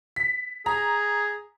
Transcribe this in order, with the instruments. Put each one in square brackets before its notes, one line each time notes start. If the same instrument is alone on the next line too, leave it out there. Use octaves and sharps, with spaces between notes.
[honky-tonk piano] B6
[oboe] G#4 [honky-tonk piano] A#5